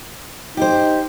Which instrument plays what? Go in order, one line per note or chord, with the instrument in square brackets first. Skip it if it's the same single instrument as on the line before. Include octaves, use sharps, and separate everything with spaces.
[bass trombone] D#4 [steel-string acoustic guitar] G4 C5